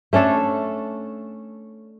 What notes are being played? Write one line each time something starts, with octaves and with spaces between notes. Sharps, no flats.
A3 C#4 D4 A4